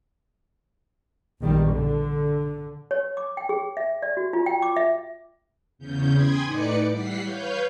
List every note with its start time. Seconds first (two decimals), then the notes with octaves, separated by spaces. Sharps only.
1.40 A#1 E2 D#3 G3
1.71 D3
2.91 C#5
3.17 D6
3.37 G5
3.49 G#4
3.77 E5
4.03 D5
4.17 F#4
4.33 F4
4.46 G5
4.62 D6
4.76 E5
5.79 E2 C#3 C#4 G6
6.13 G5 G#5 B5 C6 D#6 G#6
6.44 A2 D#4 B4 D5 D6 C#7
6.91 E3 G3 F#5 B6 C7
7.21 B4 C#5 F5 G6